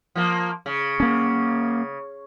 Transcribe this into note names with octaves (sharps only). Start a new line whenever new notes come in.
F3 A#3
C#3
A#3 C#4